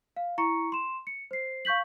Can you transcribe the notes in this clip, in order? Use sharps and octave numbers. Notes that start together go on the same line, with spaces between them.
F5
E4 A#5 C#6 C#7
C6 E7
C#7
C5 C7
F5 C#6 G6 B6 F#7